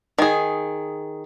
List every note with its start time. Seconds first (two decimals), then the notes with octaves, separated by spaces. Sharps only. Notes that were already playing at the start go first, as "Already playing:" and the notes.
0.19 D#3 G#4